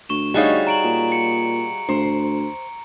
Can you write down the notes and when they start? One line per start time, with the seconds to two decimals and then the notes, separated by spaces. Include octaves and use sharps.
0.09 D2 C#6 E7
0.34 G3 D#4 F#4 G#4 C#5 F5
0.67 A#5 D7 F#7
0.84 A#2
1.12 C#7
1.89 D2 C5